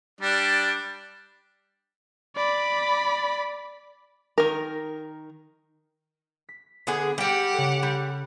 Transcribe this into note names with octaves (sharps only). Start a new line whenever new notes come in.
G3 D4
D5 B5
D#3 A#4
B6
D3 B3 G#4
G3 G4 F#5 G5
C#3 A4
G3 F#6